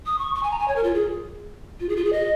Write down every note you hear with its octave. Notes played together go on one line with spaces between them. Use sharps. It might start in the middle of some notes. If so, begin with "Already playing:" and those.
D#6
C#6
C#6
G#5
A#5
G#5
C#5
A#4
F4
G#4
F4
G#4
F4
G#4
D#5